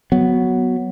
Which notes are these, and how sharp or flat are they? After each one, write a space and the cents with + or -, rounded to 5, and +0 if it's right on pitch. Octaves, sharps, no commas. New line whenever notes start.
F#3 +5 B3 +0